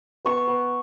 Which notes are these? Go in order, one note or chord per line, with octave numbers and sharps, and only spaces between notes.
B3 C#6
B3